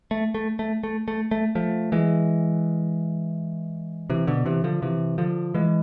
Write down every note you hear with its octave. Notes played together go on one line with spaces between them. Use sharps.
A3
A3
A3
A3
A3
A3
F3 A3
E3 G#3
C3 E3
B2 D3
C3 E3
D3 F3
C3 E3
D3 F3
E3 G#3